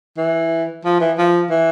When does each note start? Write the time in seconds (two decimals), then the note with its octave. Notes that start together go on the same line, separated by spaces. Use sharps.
0.17 E3
0.85 F3
1.00 E3
1.18 F3
1.50 E3